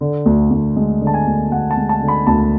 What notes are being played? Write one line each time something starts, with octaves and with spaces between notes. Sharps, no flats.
D3
D2
D2
G#3
D3
A5
G#5
D2
D2 F#5
A5
G#3
A5
D3
B5
D2 A5